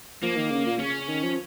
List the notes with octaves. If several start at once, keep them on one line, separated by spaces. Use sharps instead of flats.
F3 A#3
D#3
C#3
A#2
C#3 C#4
D#3
F3